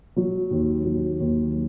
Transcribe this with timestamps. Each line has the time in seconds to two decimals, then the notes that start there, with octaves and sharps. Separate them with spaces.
0.16 F#3
0.51 D#2
0.85 F#3
1.20 D#2